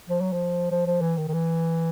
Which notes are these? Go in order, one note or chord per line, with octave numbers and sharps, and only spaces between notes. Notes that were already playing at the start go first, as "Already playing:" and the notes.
F3
F#3
F3
F3
F3
E3
D#3
D#3
E3